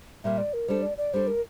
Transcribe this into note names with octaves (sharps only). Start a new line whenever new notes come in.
A#2 G3 A#3 E5
D5
A#4
G3 D4 A4 C5
D5
D5
G3 D4 A4 C5
A#4